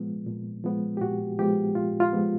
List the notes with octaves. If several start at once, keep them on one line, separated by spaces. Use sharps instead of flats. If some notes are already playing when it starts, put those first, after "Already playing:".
Already playing: A#2 F3 G#3 B3
A#2
F3 G#3 B3
G4
A#2 F#4
F3 G#3 B3 G4
A#2 F4
F4
F3 G#3 B3